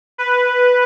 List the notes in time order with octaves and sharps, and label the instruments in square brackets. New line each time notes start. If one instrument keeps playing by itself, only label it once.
[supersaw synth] B4